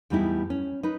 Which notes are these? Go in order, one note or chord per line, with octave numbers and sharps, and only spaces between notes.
E2 A2 G3 B3 D#4 E4
C#4
D#4 B4